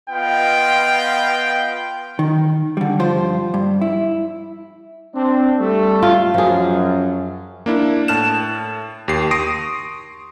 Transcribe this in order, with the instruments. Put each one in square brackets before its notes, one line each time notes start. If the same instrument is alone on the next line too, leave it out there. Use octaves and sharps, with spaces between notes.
[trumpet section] B3 F4 D#5 F5 G5
[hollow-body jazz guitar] D#3
D3 G3
G2 F3 G3 F4 C5
G2
E4
[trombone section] C4 D4
G3 A3
[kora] F4
[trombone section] F#2 [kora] F3 G#4
[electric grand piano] A#3 D4 E4
A2 A5 F6 F#6 E7
D#2 G4 C7
C6 C#6 D#6 A#6 C7 D7